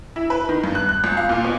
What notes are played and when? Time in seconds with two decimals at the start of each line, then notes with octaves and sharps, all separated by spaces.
0.16 E4
0.30 B4
0.49 D#3
0.64 G2
0.75 F#6
0.89 F#6
1.04 C#2
1.17 F5
1.29 A#2
1.44 B2